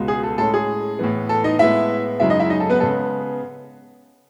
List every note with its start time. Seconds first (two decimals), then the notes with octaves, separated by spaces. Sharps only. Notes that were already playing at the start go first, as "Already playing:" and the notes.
Already playing: C#2 B2 G#3
0.08 G#4
0.23 A4
0.38 A2 G#3 C#4 A4
0.54 G#4
0.99 A2 E3 B3
1.29 A4
1.44 D#4 D#5
1.59 A2 G#3 B3 E4 E5
2.20 F#2 C#3 G#3 C#4 E4 E5
2.30 D#4 D#5
2.39 E4 E5
2.50 D#4 D#5
2.60 A4
2.70 B3 B4
2.80 C#3 G#3 B3 A4